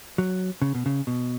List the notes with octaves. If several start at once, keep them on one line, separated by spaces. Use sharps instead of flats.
F#3
C#3
B2
C#3
B2